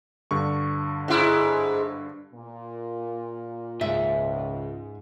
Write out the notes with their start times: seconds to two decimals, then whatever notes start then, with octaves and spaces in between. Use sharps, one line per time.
0.31 G2 D3 C#6
1.08 G#2 E4
2.34 A#2
3.81 C#2 G#2 E5